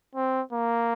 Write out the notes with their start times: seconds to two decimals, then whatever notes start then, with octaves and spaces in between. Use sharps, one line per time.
0.15 C4
0.52 A#3